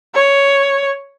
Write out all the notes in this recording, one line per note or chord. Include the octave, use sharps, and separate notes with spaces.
C#5